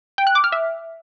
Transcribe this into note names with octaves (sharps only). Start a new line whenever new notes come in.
G5
F#6
D6
F6
E5